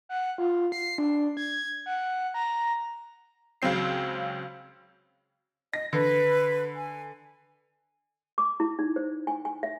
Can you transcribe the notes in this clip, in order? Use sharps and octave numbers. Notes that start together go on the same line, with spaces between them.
F#5
F4
C7
D4
G#6
F#5
A#5
C#2 C#3 F#3 C4 C7
D#5 A#6
D3 B4
G#5
D6
E4
D#4
C5
G#5
G#5
E5